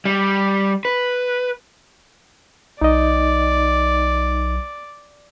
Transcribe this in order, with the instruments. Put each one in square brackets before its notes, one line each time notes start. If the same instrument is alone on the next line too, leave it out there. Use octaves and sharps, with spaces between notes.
[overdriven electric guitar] G3
B4
[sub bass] B1 [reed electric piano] D#4 D#5 [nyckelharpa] D5